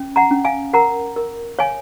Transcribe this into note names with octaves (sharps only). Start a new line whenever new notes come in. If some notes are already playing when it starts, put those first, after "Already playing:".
Already playing: C#4
F#5 A#5
C#4
F5 G#5
A#4 F#5 A#5
A#4
C#5 F5 G#5